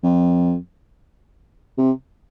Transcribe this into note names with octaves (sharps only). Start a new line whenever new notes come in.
F2
C3